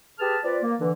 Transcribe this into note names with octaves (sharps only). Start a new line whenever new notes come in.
G4 G#4 B4 A5 F6
C4 F4 B4 D5
A#3
D3 E3